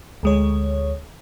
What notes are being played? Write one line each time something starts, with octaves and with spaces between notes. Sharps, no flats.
D2 G#3 C#5